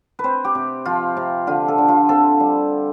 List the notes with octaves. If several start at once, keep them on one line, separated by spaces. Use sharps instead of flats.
B4
C4 C5
G4
C3
F3 F4
C3
D3 F4
A4
D3
F4
C4 A4
G3